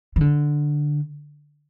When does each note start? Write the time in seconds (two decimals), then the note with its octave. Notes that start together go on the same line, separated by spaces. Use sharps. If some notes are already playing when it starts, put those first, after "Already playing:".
0.16 D#3
0.21 D3